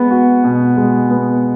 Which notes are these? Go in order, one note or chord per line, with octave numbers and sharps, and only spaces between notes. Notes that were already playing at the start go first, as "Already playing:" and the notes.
Already playing: G#3 B3
F#4
B2
G#3
B3